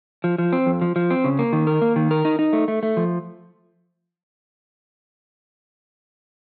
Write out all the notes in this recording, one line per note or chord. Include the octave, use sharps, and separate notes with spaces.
F3
F3
C4
F2
F3
F3
C4
C#3
A#3
D#3
A#4
A#3
D#3
A#4
D#4
D#4
A3
A3
A3
F3